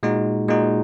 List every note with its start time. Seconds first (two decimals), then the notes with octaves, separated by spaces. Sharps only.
0.03 A#2 G#3 D#4 F#4
0.48 A#2 G#3 D#4 F#4